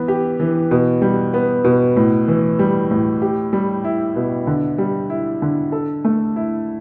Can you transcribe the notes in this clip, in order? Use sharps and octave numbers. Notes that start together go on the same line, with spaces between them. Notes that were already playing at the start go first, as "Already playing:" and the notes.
Already playing: E3 B3
G4
E3
B2
G3
B3
B2
A2
E3
G3
A2
G4
G3
E4
B2
D3
G3
E4
D3
A4
A3
E4